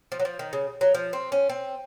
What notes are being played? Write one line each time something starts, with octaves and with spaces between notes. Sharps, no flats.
F3
F#3
F3
D#3
C#3
F#3
F3
C4
C#4
C4